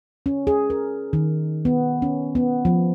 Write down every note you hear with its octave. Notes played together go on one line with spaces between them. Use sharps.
C#4
G#4
A#4
D#3
B3
C#4
B3
F3